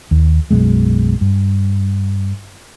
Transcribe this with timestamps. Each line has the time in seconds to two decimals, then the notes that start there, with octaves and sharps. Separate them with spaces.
0.11 D#2
0.51 B1 F#2 B2 G#3
1.21 G2